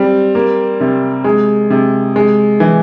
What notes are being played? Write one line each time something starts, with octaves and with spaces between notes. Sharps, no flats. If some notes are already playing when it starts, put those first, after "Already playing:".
Already playing: G3 C4
A#3
C3
G#3
C3
G#3
E3